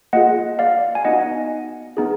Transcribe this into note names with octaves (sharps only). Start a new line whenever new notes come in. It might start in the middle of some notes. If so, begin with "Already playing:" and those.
A#3 F4 G#4 D#5 F#5
D5 F5
G#5
B3 D#4 F#4 D#5 F#5
B3 D#4 G#4